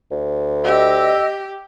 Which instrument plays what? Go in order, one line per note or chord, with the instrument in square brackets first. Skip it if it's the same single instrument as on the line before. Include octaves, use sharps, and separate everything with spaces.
[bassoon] D2
[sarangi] G4 [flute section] D#5 E6